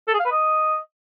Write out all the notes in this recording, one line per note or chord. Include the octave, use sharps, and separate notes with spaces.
A4
G#4
F5
B4
D#5